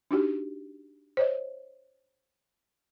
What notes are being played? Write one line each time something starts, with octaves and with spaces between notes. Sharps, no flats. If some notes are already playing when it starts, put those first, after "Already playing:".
D4 D#4 F#4 G4
C5 C#5 D#5